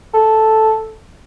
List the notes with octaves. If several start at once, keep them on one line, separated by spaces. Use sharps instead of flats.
A4